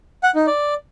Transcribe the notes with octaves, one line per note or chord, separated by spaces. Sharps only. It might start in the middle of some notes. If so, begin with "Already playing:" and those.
F#5
D#4
D5